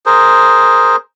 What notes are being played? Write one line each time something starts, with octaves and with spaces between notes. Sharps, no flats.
G#4 A#4 C5